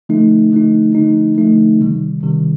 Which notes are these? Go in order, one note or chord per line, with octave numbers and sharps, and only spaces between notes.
D3 F3 A3 D#4
D3 F3 A3 D#4
D3 F3 A3 D#4
D3 F3 A3 D#4
C3 D#3 G3
C3 D#3 G3